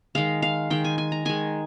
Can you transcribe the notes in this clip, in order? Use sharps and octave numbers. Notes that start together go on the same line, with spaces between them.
D#3 G#3 F5
F5
D#3 G#3 G5
G#5
G#5
A#5
D#3 G#3 G#5